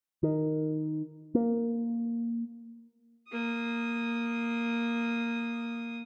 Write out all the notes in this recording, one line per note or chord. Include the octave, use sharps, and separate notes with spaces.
D#3
A#3
A#3 D#6